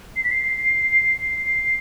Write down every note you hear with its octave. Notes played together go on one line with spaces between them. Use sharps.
C7
B6
C7